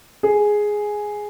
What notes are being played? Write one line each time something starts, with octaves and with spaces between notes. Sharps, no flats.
G#4